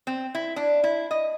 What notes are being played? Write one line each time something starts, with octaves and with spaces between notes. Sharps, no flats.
C4
E4
D4
E4
D#5